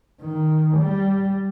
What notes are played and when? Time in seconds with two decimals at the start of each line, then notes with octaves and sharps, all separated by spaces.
0.22 D#3
0.78 G3